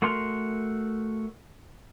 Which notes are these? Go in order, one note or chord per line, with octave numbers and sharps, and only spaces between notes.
A3 F#4 A#4 C6 F6